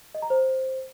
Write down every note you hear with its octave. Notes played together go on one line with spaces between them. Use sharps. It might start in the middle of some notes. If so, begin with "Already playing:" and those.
D#5
A#5
C5